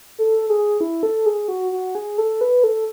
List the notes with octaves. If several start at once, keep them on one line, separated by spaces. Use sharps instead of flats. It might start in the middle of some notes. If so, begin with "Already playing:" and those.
A4
G#4
E4
A4
G#4
F#4
F#4
G#4
A4
B4
A4